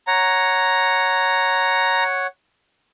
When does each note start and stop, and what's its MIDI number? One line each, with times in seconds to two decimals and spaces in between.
0.07 2.27 73
0.07 2.27 78
0.07 2.04 82